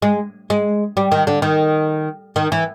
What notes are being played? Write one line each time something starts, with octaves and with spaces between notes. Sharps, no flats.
G#3
G#3
G3
D#3
D3
D#3
D#3
E3